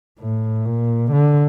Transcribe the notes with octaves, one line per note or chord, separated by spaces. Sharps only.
A2
A#2
D3